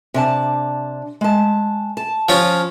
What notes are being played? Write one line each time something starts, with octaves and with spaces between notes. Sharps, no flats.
C3 D4 A5
G#3 A5
A5
F3 C#4 F4